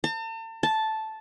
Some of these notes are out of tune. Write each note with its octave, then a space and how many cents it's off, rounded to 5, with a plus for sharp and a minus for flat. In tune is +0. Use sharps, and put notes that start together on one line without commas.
A5 +40
A5 -5